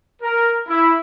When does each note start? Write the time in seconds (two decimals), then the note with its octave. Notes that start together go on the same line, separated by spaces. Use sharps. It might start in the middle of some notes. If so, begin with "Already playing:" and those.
0.22 A#4
0.68 E4